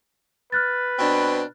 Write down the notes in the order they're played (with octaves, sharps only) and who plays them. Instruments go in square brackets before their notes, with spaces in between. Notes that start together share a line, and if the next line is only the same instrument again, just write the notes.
[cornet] B4 [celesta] F6 F#6 A6
[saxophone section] B2 C4 D4